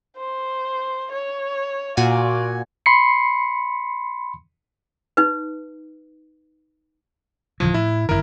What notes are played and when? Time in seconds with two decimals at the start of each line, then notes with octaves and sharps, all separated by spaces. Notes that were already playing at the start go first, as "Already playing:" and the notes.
0.17 C5
1.12 C#5
1.97 A#2 F4 F#4 D5 G#5
2.86 B5 C6 C7 C#7
5.17 D#4 B4
7.60 D1 C#3 E3 F3
7.74 A2 E4
8.09 G1 F#2 D#3 E4 A#4